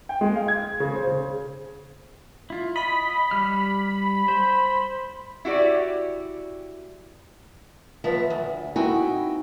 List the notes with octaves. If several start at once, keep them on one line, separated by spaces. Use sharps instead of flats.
G5
G#3
F5
G#6
C#3
C5
C#3
E4 F4
D#5 B5
G3 F6
C5
E4 F#4 G4 D5
D#2 F3 B3 B4 E5
D2
C4 D#4 E4 F#4 G5 G#5